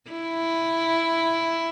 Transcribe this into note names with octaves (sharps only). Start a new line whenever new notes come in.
E4